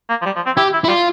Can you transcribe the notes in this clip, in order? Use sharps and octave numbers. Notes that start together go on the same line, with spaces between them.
A#3
F3
G3
F3
C4
E4 G4
E4
E4
G3 F4